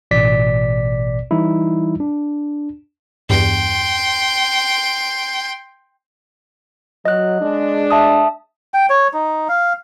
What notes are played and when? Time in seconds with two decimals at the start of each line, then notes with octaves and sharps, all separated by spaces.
0.11 A1 B2 D5 B6
1.31 E3 G3 D#4 E4
2.00 D4
3.30 E2 G2 G5 C6
7.05 F#3 D#5 F#6
7.41 G#3 D4
7.91 E5 A5 D#6
8.74 G5
8.90 C#5
9.13 D#4
9.49 F5